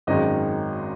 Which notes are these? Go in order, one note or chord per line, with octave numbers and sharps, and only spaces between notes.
G#1 F#2 D#3 G#3 D#5